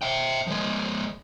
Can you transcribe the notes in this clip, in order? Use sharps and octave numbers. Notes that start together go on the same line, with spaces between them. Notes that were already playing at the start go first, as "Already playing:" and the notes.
E5 G5
F3 G#3